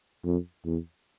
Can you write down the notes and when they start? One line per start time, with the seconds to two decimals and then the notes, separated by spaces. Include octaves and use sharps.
0.25 F2
0.65 E2